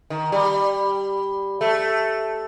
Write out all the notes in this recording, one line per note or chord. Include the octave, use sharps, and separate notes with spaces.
D#3
G3
A3